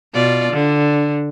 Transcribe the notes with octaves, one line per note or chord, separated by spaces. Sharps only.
B2 F4 D5
D3